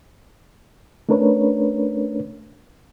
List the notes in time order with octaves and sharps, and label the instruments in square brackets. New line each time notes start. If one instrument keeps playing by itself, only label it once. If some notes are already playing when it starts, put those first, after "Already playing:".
[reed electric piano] A3 C#4 D4 A#4 B4 C#5